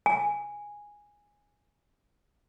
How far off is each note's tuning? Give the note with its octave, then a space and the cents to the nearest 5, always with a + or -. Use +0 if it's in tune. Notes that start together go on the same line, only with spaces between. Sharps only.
G#5 -10